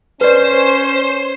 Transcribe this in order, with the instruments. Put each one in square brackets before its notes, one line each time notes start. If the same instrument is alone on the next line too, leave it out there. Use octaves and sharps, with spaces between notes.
[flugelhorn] C#4 [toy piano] B4 D5 [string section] C5